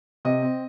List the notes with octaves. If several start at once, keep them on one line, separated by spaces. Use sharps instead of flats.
C3 D#5
C4